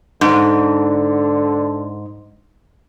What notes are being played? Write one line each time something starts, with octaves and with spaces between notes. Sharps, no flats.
G#2 D3